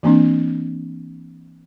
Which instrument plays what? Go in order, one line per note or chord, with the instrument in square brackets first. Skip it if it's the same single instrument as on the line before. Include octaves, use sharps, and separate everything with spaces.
[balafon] E3 A#3 C4 D4